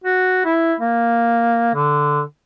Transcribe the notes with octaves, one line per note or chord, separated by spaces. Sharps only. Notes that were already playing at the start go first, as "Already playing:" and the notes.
F#4
E4
A#3
D3